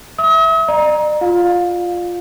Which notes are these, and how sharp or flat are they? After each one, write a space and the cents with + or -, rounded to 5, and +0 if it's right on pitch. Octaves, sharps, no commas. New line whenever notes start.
E5 +0 D#6 +45
D5 +45 A#5 +20
F4 +0 F5 +25